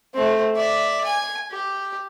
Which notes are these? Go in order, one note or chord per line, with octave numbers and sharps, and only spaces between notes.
A3 C4
D5 E5
G#5
G4